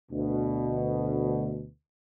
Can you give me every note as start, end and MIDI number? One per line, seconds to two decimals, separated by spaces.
0.11 1.67 38
0.11 1.67 47